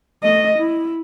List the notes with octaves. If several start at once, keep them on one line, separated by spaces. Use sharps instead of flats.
A3 D#5
E4